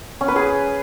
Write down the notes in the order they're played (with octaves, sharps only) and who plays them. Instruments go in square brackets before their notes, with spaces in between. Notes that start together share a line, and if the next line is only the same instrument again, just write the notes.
[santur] C#4
B4
G#4